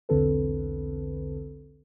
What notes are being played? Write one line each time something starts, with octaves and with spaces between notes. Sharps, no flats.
B1 E2 D3 C4 A4 B4